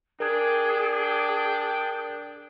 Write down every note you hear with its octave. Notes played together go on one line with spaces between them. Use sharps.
D4 G#4 A#4 G5